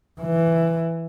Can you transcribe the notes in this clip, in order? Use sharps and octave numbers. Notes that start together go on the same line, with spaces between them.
E3